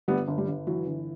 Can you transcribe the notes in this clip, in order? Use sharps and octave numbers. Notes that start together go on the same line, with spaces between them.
G1 G3 B3
G1
G3
G1
E3 F#3
G1